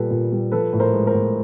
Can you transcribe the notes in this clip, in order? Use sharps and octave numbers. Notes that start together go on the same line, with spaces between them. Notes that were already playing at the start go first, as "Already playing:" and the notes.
Already playing: A#2 G3 A4 B4
A#2
G3
F3 A4 B4
A2
A#4 C5
G#3
A#4 C5
A2